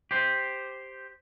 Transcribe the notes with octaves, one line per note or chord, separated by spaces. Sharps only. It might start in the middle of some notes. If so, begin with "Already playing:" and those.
G4 C5